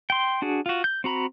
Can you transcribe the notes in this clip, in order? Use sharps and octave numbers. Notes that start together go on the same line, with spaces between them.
G5 C6
D4 F#4 G#4
F4 F#4
G6
C4 F#4 A#5 B5